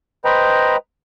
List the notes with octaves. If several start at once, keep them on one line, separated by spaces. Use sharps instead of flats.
B4 C5 D#5 G5 A#5 B5